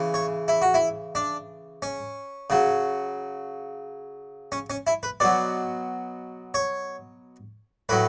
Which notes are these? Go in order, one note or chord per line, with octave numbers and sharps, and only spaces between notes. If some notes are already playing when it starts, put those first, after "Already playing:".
Already playing: C#3 E3
C#5
E4
F#4
E4
D4
C#4
C#3 F#3
C#4
C#4
E4
B4
B2 F#3 D5
C#5
A2 F#3 B4